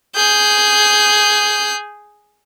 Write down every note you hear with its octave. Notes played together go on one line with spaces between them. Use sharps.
G#4 G6